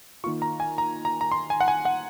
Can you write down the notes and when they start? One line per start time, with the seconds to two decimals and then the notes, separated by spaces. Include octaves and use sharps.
0.24 D#3 A#3 F4 C#6
0.42 A#5
0.60 G#5
0.78 A#5
1.05 A#5
1.21 A#5
1.32 C6
1.50 G#5
1.60 F#5
1.68 G#5
1.85 F#5